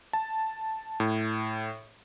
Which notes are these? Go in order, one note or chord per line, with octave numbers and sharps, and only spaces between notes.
A5
A2